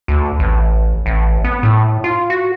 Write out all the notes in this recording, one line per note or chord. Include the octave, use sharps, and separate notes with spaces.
D2
A1
A1
B3
A2
F4
F#4